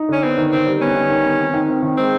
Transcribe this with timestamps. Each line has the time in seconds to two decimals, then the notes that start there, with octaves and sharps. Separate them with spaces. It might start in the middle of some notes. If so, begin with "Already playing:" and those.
Already playing: D#4
0.09 D3 C#4
0.23 B3 C4
0.38 D#3
0.52 D#3 C4
0.66 G3
0.81 B3 C#4
0.95 D#3
1.10 D#3
1.24 B3
1.40 C4
1.54 D#3
1.68 C4
1.82 D#3
1.97 G#3 C4